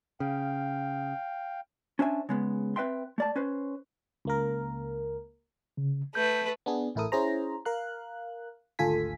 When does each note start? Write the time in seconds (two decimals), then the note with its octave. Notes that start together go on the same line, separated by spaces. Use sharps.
0.20 C#3 F5 G5
1.99 C#4 D4 C5 E5 G#5
2.29 C#3 G#3 B3
2.76 C4 B4 E5 G5 C6
3.18 A3 D5 A5
3.36 C#4 B4 C5
4.25 C#2 A#3 A#4
5.77 C#3
6.15 A3 B4 G6
6.66 B3 D4 G#4
6.95 A1 A2 E4 A4 A#4 D#6
7.12 C#4 E4 G#4 C5 A#5
7.65 A#4 F5 F#6
8.79 G#1 D2 F4 A4 G#5 B6